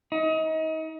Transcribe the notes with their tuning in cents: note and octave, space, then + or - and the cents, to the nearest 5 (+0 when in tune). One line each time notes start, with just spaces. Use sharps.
D#4 +30